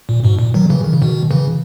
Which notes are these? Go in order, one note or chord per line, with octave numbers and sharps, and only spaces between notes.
A#2
G#2 B2
A#2
D#3 F#3
C#3 E3
D#3
C#3
B2 D#3
C#3 E3